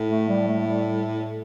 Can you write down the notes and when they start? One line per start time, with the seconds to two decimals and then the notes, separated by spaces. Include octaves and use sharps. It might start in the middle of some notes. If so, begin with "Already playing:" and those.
Already playing: A2
0.09 A3
0.28 G3
0.48 A3
0.60 A3
0.67 G3